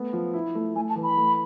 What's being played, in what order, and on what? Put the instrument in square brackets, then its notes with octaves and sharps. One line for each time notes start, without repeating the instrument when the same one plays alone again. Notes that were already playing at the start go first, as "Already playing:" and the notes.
Already playing: [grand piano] A3 B3
F3
E4
A3
[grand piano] A3 [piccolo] G#5
[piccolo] A5
[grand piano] E3
[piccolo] B5
[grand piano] A3